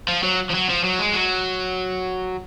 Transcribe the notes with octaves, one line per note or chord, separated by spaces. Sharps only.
F3
F#3
F3
F#3
F3
F#3
G#3
F#3